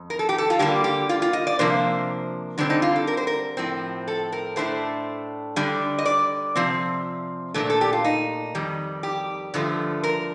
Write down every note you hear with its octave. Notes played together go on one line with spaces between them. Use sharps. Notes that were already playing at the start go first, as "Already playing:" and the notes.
Already playing: F2
A#4
A4
G4
A4
F4
D3 G3 A#3 G4
G4
F4
F4
D#5
D5
C3 F3 A#3 D4 C5
D3 G3 C4 D4
D#4
F4
A4
A#4
C5
A#4
A2 F3 C4
A4
A#4
A2 A3 D4 C5
D3 G3 D4
D#5
D5
C3 F3 C4
A#2 A3 D4 A#4
A4
G4
F4
D#4
F2 D#3 G3
G4
G2 D3 F3 A3
A#4